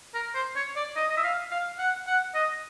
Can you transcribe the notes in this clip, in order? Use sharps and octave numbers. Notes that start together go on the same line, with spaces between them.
A#4
C5
C#5
D5
D#5
D#5
E5
F5
F5
F#5
F#5
D#5